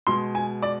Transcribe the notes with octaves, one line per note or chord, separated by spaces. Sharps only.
B2 G#3 C6
G#5
D5